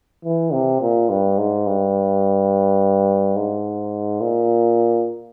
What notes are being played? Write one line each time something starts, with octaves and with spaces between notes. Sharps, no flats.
E3
C3
A#2
G2
G#2
G2
G#2
A#2